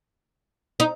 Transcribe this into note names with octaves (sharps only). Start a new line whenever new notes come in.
D#4